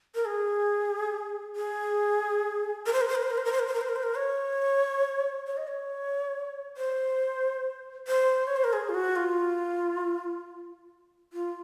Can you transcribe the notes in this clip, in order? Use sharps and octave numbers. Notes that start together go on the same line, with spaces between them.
A#4
G#4
G#4
A#4
C5
A#4
C5
A#4
C5
A#4
C5
A#4
C5
A#4
C5
A#4
C5
A#4
C5
A#4
C#5
C#5
D#5
C#5
C5
C5
C#5
C5
A#4
G#4
F4
F#4
F4
F4